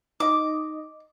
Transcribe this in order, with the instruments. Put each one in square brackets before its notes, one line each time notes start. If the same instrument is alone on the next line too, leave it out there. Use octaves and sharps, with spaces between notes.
[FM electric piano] D#4 D#5 [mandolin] D6